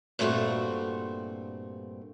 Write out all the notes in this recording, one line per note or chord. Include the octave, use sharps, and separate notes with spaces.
G2 A#2 A3 B3 C4 F#4